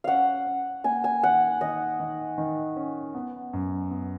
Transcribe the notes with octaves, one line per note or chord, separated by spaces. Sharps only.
C#4 F5 F#5
C#4
A#3 G#5
G#5
D#3 F#5
D#3 D#5
D#3
D#3
C#4
B3
F#2
B3